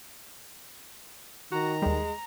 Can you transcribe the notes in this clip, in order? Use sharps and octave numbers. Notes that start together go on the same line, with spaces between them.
D#3 F#4 A#5
D#2 G3 G#3